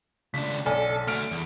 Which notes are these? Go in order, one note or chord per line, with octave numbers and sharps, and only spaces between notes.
C#2 D4 B6
B1 A4 D5 G#5
A3 F#4 F6 D7
E2